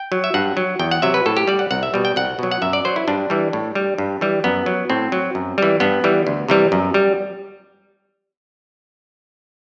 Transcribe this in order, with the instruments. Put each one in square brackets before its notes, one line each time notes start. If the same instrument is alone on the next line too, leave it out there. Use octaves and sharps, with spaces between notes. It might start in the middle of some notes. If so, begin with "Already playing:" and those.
Already playing: [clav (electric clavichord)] G5
F#3
E5
G2 F#5
F#3
E2 G5
F#5
C3 F#3 E5
B4
A2 A4
G4
G3 D5
F#5
C2 F#5
E5
B2 G3
G5
C2 F#5
B2 F#3
F#5
F#2 E5
D5
F#3 C5
E4
G2 D4
E3 G3
A2
G3
G2
E3 G3
F#2 B3
F#3
A2 C4
F#3
F#2
E3 G3
G2 B3
E3 G3
D2
C3 E3 G3
F#2
G3